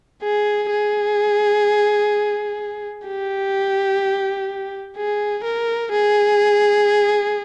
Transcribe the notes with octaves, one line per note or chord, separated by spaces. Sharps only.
G#4
G#4
G4
G#4
A#4
G#4